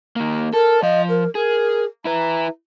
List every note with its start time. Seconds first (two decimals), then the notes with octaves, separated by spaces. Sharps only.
0.16 D#3 A#3
0.54 A4 A#4
0.83 F3 D#5 F5
1.09 A#4
1.35 G#4 A#4
2.05 E4 B4 A#5